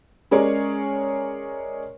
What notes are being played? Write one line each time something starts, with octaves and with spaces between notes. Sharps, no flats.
G#3 C#4 G#4 A#4 C#5 D5